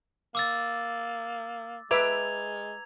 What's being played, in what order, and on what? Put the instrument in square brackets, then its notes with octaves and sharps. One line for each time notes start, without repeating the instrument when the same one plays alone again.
[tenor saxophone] A#3 [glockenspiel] D6 E6 A6
[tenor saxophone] G#3 [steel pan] B4 E5 D6 [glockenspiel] A#5 G#6 F7